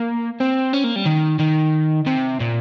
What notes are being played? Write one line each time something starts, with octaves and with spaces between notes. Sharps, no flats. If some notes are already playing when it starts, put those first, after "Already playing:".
Already playing: A#3
C4
C#4
A#3
G3
D#3
D#3
C3
A#2